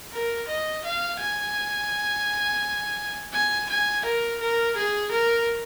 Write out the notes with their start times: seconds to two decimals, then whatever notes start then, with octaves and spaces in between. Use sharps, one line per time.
0.13 A#4
0.48 D#5
0.85 F5
1.21 G#5
3.34 G#5
3.70 G#5
4.06 A#4
4.41 A#4
4.77 G#4
5.12 A#4